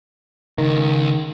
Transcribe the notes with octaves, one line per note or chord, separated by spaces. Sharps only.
C#2 D#3